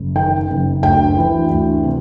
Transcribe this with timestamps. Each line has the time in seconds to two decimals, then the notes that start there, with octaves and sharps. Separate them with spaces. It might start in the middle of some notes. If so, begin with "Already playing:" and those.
Already playing: F#1
0.15 D#3 G5
0.49 F#1
0.83 D2 G5
1.17 E3
1.50 D2
1.84 C3